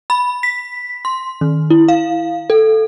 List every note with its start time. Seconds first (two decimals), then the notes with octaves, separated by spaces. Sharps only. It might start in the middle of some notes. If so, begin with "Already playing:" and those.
0.10 B5
0.43 B6
1.05 C6
1.41 D#3
1.70 E4
1.88 F5
2.50 A4